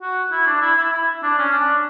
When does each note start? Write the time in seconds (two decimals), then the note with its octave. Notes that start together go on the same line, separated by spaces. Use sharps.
0.01 F#4
0.32 E4
0.47 D4
0.62 E4
0.77 E4
0.93 E4
1.23 D4
1.38 C#4
1.53 D4